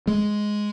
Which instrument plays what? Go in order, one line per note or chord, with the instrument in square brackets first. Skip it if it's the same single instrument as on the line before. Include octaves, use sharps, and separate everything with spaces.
[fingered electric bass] G#3